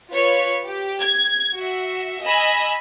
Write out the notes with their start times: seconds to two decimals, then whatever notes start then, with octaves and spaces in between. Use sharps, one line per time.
0.11 F4 B4 C#5
0.65 G4
1.02 G#6
1.56 F#4 E5
2.24 D#5 G#5 B5 E6